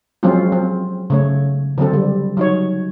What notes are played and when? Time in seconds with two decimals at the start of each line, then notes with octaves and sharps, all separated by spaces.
0.23 F3 F#3 G#3 C4 C#4 F4
0.52 C4
1.10 C#3 A3 C#5
1.78 D3 F#3 C4 A4
1.94 G3
2.37 F#3 D#4 C#5